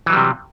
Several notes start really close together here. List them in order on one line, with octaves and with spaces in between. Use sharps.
E3 F#3 G3 C3